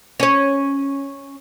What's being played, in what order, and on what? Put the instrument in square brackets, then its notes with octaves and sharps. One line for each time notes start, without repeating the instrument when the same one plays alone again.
[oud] C#4 C#5